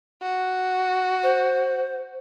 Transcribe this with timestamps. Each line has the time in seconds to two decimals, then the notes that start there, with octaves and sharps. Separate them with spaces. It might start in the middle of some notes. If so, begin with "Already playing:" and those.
0.22 F#4
1.22 C5